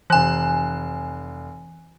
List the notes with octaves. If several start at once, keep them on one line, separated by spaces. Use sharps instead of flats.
F1 E3 G#5 F#6